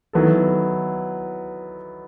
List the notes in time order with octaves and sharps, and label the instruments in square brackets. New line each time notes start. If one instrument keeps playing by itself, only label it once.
[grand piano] D#3 F#3 B3 E4 A4